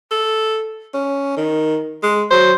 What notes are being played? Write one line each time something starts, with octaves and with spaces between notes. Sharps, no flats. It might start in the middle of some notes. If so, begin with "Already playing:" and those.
A4
C#4
D#3
G#3
F#3 C5